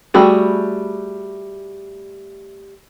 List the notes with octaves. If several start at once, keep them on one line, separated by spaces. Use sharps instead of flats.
G3 A3 F#4 G#4